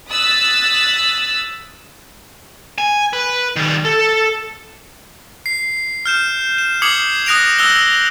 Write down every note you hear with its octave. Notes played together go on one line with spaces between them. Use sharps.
D#6 E6 F#6 A6 B6
G#5
B4
D#3 G3
A4
C7
F6 G6 E7
E7
D6 D#6 G#6 C7 C#7 F#7
D#6 F#6 A#6 D7 F7
D#6 E6 F#6 G6 A#6 G7